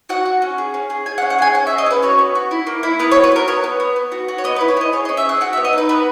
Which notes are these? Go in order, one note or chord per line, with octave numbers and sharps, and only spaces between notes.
F#4 F#5
F#4
C#4
G#4
C#4
G#4
G#4 G#5
F#5
C#4
F#5
G#4 G#5
C#4 F#5
E5
G#4
D#5
C#4 B4
F#4 C#5
B3
F#4
E4
A#3
E4
B3 B4
C#5
F#4
B4
F#4 A#4
B3 C#5
B3
B3
B3
F#4
F#4
C#5
B3 D#5
B4
E4
C#5
B3 D#5
G#4 C#5
D#5
C#4
E5
G#4 F#5
F#4 F#5
E5
B3
D#5
D#4 B4
B3 B4